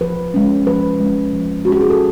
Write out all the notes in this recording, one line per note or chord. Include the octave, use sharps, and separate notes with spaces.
F3 B4
G#3 C#4
F3 B4
G#3 C#4
F3
G#3 C#4 F#4
G4
G#4
A4